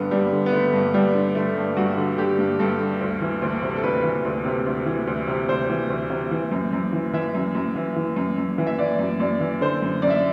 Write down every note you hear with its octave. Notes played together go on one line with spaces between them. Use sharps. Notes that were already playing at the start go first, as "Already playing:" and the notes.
Already playing: G2 D3 B3
G2 G3
D3
B3
D3 A3
G2
G2 G3
D3
D3 A3
G2
G2 F#4
D3
D3 G4
G2
G2 A4
D3
D2
E3
D2
C3
A4
D2 B4
E3
D2
C3
D2
E3
D2
C3
D2 C5
E3
D2
C3
E3
F#2
F#2
E3
E3 E5
F#2
F#2
E3
E3
F#2
F#2
E3
E5
E3 D5
F#2
F#2 D5
E3
D3 C5
F#2
F#2 D5
E5